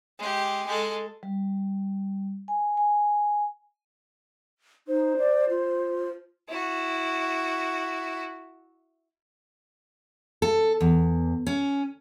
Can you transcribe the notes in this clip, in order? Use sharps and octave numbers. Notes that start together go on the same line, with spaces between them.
G#3 G4
G#3 A4
G3
G#5
G#5
D#4 C5
D5
F4
E4 F#4
A4
E2
C#4